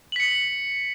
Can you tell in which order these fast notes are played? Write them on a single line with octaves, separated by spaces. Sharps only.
F#7 B6 C#7